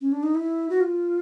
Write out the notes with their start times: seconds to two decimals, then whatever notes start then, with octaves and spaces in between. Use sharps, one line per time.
0.01 C#4
0.12 D4
0.23 D#4
0.35 E4
0.70 F#4
0.81 F4